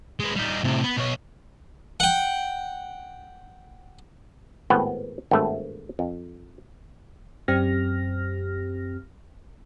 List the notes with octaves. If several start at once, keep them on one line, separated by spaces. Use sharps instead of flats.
G#3 B3
G3 D#4
A2 C3
B3
B2 C#5
F#5 G5
G#1 A2 B3 B4 G5
G#1 G2 B2 A3
F2
F#2 C4 G4 F6 A#6